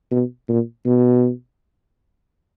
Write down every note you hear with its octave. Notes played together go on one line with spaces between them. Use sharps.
B2
A#2
B2